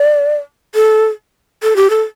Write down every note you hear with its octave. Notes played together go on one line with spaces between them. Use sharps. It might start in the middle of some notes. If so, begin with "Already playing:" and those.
Already playing: D5
A4
A4
G4
A4